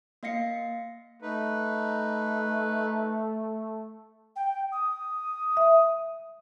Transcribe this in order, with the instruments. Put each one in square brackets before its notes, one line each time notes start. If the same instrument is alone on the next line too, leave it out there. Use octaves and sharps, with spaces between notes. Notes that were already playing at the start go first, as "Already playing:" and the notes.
[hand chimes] A#3 D#5 F5 A#6 C7 C#7
[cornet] A3 [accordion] D#4 B4
[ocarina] G5
D#6
[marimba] E5